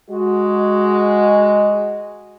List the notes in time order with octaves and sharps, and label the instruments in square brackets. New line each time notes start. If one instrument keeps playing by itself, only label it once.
[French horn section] G#3 F#4